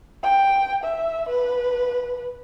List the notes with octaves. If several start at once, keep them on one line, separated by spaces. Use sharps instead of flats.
G5
E5
B4